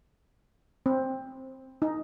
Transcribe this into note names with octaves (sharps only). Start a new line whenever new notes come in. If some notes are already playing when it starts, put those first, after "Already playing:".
C4
D#4